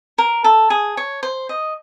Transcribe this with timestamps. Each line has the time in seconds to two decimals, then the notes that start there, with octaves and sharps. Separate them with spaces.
0.18 A#4
0.44 A4
0.70 G#4
0.97 C#5
1.23 C5
1.49 D#5